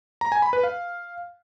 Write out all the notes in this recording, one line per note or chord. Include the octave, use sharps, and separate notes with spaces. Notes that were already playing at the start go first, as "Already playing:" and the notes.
A#5
G#5
B5
B4
F5